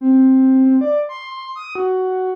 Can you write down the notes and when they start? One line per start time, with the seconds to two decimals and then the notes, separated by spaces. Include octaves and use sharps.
0.01 C4
0.81 D5
1.09 C6
1.56 D#6
1.75 F#4